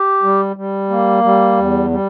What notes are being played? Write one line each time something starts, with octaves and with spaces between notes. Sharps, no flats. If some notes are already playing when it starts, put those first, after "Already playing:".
Already playing: G4
G3
G3
A#3
G3
E2
G3